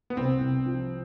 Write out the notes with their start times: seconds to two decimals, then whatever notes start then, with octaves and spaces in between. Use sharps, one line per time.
0.10 B3
0.17 C2 C4
0.41 C2
0.65 F3